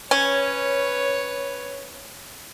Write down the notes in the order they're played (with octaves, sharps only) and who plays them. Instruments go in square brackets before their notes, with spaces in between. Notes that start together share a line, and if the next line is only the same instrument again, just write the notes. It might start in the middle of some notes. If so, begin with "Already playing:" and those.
[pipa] C#4 [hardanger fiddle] B4 C#5